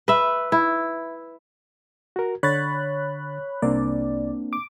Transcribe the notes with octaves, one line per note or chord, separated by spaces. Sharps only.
B4 E5
E4
F#4 A#4
D3 C#5 B5 F#6 A6
C2 A#3 C4 D4 D5
D6